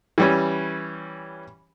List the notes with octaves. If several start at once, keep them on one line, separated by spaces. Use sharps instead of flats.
E3 G3 C#4